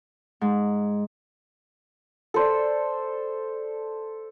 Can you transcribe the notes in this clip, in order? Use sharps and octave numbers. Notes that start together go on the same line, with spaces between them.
G#2
A4 C5 D5